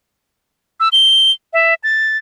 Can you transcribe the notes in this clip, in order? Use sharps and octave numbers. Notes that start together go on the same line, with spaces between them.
E6
G7
E5
A6